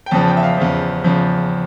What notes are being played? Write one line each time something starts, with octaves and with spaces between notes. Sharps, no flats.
G5
E2 C#3 F3 A5
G5
E5
F5
E2 C#3 F3
E2 C#3 F3